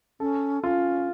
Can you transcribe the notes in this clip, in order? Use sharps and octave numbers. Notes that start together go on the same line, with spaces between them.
C#4 A4
C#4 F4